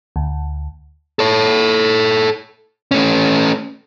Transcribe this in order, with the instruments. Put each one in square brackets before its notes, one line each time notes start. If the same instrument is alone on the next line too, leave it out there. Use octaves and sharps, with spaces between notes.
[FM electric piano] D2
[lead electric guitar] A4 C#5
A3 C#4